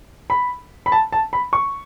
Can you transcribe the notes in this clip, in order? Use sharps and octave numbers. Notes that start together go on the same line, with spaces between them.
B5
B5
A5
A5
B5
C#6